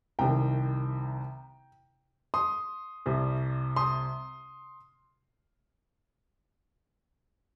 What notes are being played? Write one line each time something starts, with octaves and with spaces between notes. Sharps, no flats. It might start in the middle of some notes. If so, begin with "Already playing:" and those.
C2 C3 D#3 G5 A#5
C6 D#6
C2 C3 G3
C6 D#6